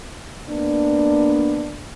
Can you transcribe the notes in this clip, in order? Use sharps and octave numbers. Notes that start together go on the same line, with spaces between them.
A#3 B3 D4